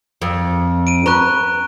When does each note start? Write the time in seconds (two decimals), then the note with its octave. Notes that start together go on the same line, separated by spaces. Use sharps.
0.22 F2
0.87 D7 D#7
1.06 B4 A#5 C#6 F#6